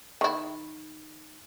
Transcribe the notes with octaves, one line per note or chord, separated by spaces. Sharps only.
D#3 E4